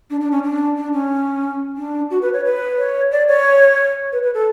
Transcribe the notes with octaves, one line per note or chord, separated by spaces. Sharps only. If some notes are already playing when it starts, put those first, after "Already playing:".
D4
D4
C#4
D4
D4
C#4
D4
F#4
B4
C#5
B4
C#5
D5
C#5
B4
B4
A4